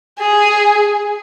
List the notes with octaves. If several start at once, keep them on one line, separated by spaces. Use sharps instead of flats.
G#4